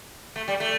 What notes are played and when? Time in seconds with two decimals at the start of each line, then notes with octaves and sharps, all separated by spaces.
0.36 A3
0.48 G3
0.60 A3